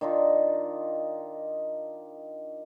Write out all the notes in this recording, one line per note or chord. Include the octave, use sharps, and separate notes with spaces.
D#3 D4 D#4 F4